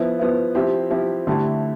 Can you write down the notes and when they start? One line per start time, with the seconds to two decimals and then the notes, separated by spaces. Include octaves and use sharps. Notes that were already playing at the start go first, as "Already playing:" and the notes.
Already playing: F3 B3 E4
0.19 F3 B3 E4
0.55 F3 C4 E4 G4
0.91 F3 C4 E4 G4
1.27 D3 A3 E4 G4